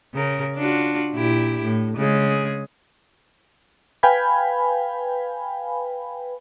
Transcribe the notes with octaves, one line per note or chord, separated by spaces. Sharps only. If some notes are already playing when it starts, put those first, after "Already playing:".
C#3 A#4
D4 F4 F#4
A#2 E4 G4
A2
C#3 G#3 G#4
B4 F5 G5 G#5 B5